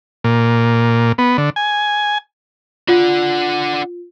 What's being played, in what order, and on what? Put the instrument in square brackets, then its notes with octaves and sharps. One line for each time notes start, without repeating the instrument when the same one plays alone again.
[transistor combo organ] A#2
B3
D3
G#5
[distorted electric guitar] D4 F#5 [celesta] F4